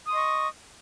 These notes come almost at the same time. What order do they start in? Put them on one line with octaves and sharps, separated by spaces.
D#6 C6 D#5 C#6